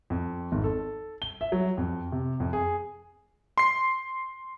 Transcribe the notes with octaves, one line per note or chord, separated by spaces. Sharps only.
F2
G#1
A4
G7
E5
F#3
F2
C3
F2
G#4
C6 C7